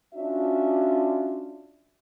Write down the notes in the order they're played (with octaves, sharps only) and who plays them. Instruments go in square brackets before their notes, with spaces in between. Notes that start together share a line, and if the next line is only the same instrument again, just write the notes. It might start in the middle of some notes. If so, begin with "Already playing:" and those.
[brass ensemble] C#4 D4 F4 F#4 E5